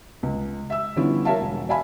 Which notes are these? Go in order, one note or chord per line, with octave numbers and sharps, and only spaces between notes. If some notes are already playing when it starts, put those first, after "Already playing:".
C#2
E5 E6
D3 F3 G3 B3 C#4 E4
A#4 C#5 E5 F5 A5
E1
D5 E5 F5 G#5 B5